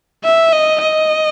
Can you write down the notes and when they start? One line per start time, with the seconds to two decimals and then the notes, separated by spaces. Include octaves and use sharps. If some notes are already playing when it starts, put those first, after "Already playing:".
0.24 E5
0.52 D#5
0.81 D#5